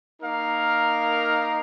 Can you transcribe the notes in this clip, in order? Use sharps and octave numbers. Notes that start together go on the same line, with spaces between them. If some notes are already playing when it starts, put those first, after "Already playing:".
A#3 D#4 A#4 F5